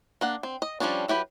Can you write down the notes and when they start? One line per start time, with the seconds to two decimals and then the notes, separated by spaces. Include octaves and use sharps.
0.21 A#3 D4 F#5
0.43 C4
0.62 D#5
0.80 F3 G3 G#3 C#4 D4
1.08 F#3 E4 G4 B4